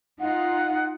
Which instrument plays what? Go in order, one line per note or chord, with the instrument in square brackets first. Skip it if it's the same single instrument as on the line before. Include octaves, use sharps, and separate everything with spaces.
[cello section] D#4 F4 [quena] F#5